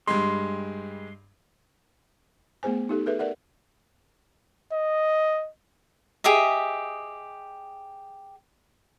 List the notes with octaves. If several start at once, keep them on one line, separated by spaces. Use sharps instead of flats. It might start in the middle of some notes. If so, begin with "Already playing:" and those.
G2 G3 G#3 C6
A3 B3 G#4 C5 G#5
D#4 G4 A4
G#4 A4 B4 E5
A#4 D5 E5 F#5
D#5
G4 G#4 D#5 E5